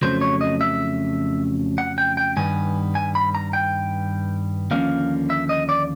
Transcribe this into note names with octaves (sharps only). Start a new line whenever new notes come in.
F2 C#3 F#3 A3 C5
C#5
D#5
E5
F#5
G5
G5
G2 D#3 G3 B3 G#5
G#5
B5
A#5
G5
D#2 D3 F3 A#3 C#4 F5
E5
D#5
D5